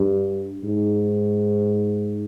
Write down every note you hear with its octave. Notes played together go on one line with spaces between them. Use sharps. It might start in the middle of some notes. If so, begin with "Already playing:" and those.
Already playing: G2
G#2